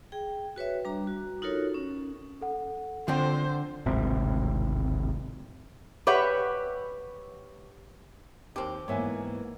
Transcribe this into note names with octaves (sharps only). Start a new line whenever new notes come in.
G#4 G5
F#4 B4 C#5 E5
G3 D4 A#5
F#4
D#4 F4 F#4 A4 A#4 C#5
C#4
A4 F#5
D3 F3 C4 D4 C5
D1 G#1 C3
G4 B4 C#5 E5 F#5
D#2 C4 G4 A#4
G#2 E3 A#3 B3 C#5 E5 G#5